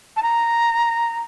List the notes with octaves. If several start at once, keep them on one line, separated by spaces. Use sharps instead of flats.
A5
A#5